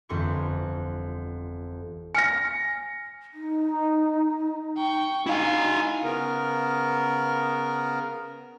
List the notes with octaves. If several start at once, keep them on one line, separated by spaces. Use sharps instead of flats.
G1 F2 E3 C6 C#6 C#7
G#5 F6 A#6 C#7
D#4
G5 C#6
D#4 E4 F5 G#5
C#3 B3 A#4